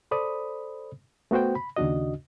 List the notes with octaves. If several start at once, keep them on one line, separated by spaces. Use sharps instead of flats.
A4 C5 D5 B5 D#6
A3 B3 F#4 C5 G5
B5
D#2 C#3 D4 F#4 D#5